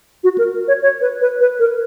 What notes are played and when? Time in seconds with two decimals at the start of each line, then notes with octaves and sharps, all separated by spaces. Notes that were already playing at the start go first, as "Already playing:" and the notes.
0.24 F#4
0.38 A#4
0.68 C#5
0.82 C#5
1.01 B4
1.21 B4
1.41 B4
1.60 A#4